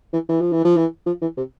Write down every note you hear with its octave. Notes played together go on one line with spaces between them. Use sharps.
E3
E3
F3
E3
F3
E3
F3
E3
C3